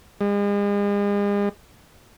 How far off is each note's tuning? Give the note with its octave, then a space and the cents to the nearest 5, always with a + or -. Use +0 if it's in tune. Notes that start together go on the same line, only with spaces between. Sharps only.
G#3 -40